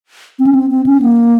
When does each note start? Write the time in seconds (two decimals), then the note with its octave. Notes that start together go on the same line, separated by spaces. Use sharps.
0.39 C4
0.47 C#4
0.55 C4
0.71 C4
0.86 C#4
1.02 A#3